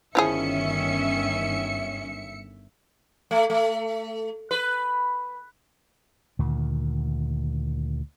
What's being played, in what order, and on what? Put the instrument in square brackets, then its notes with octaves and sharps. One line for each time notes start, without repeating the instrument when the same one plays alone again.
[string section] G1 E5 C#7 [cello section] D#3 C#4 [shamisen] F3 E4 G#4
[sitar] A3
A3
B4
[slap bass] D2 A#2 D#3